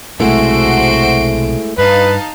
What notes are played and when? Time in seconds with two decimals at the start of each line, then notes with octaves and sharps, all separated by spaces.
0.20 B1 C3 G#3 A3 E4 F#4 C5 D7
1.78 G2 D#4 B4 F5 A5